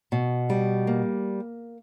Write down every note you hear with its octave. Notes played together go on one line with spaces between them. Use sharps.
B2
G3
A#3